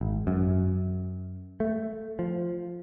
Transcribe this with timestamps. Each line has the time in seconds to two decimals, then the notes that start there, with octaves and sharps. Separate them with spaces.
0.01 G#1
0.27 F#2
1.60 A3
2.19 F3